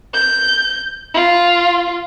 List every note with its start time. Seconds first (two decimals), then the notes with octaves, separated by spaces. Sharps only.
0.14 G6
1.14 F4